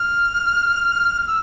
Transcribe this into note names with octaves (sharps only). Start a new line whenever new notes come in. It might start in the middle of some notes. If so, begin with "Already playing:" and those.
Already playing: F6
E6